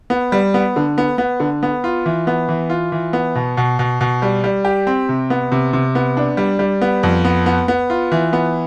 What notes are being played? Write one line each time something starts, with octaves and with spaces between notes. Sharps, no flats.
B3
G3
B3
D3
B3
B3
D3
B3
F4
E3
B3
E3
F4
E3
B3
B2
B2
B2
B2
G3
G3
G4
C4
C3
B3
C3
C3
B3
D4
G3
G3
B3
F2
B3
B3
B3
F4
E3
B3